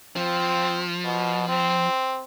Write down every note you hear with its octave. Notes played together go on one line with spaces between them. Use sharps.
F3 C4
B2
C4